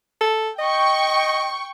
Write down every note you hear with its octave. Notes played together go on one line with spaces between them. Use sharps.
A4
D#5 G5 C#6